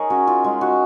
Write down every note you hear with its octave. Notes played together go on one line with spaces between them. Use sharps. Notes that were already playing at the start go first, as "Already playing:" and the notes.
Already playing: D#4 G#4 A#4 C#5 D#5
C#4 F#4
D#4 F4
G#3
D#4 F#4